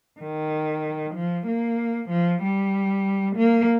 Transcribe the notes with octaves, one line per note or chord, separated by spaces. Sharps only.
D#3
F3
A#3
F3
G3
A#3